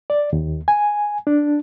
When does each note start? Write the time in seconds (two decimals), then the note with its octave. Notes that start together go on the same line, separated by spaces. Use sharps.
0.10 D5
0.33 D#2
0.68 G#5
1.27 D4